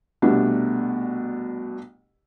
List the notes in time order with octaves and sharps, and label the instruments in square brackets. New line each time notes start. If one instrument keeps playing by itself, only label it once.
[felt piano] C2 B2 A3 D4